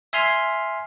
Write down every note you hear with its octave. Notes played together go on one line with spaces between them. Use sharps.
E5 G#5 C6 F6